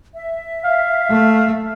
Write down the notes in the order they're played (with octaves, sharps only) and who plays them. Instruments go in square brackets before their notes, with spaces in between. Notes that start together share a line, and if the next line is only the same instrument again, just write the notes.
[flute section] E5
[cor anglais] F5
[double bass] A3